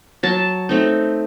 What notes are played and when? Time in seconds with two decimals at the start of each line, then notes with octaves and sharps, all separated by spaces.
0.23 F#3 A5
0.69 A3 C4 D#4